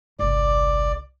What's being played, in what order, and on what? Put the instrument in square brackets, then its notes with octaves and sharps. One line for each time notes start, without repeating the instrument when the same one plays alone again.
[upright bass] G1 C2 [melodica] D5